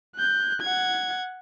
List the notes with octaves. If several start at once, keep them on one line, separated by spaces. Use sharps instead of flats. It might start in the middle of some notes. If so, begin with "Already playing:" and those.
F#6 G6
F#5 G#6